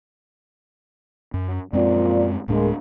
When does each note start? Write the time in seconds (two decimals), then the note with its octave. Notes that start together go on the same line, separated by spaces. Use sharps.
1.34 F#2
1.73 F#2 A#2 F3 G#3 C4 D5
2.48 D1 A2 G#3 A#3 D4